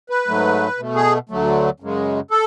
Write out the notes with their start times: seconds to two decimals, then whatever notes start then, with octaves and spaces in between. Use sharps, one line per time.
0.10 B4
0.28 G#2 F#3 A3
0.78 B2 A3
0.96 G#4
1.29 D2 D3 F#3 A3
1.80 F#2 C#3 G#3
2.31 A4